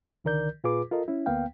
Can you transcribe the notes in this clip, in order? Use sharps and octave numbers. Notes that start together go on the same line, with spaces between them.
C2 D3 D#3 A#4 D5 G6
A#2 F4 G#4 B4 D6
F4 A4 A#4 D#5
C#4 E4
D2 A#3 B3 F5 G5